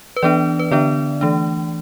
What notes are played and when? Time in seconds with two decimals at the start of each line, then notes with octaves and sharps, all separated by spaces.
0.16 B4
0.23 E3 B3 D4 D5
0.59 B4
0.71 D3 B3 D4 D5
1.21 E3 A3 D4